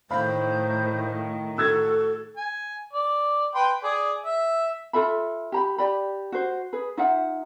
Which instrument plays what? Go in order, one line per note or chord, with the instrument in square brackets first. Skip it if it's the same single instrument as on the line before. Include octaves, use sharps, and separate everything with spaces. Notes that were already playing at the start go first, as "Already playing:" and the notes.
[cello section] A2 D#3 [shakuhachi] C5 [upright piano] F5 B5
[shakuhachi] F#4 [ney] A4 [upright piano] E6 G#6 A6
[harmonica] G#5
D5
B4 G5 C6
G#4 D5
E5
[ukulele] F4 A4 E5 B5
G4 A#5 B5
G4 D5 B5
F#4 C5
G#4 B4
D#4 F4 E5 F#5